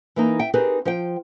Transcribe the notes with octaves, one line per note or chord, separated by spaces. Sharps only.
E3 A#3 D#4
E5 G5
C4 D#4 G4 G#4 A#4 B4
F3 C5 G5